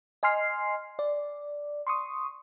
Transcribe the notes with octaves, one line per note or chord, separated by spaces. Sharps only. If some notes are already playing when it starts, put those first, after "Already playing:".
D#5 G#5 C6 F6 C7
D5
C6 C#6 D#6